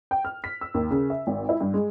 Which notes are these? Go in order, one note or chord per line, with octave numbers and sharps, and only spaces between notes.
G5
F6
B6
E6
D#2
C#3
E5
G#1
E4
G2
G#3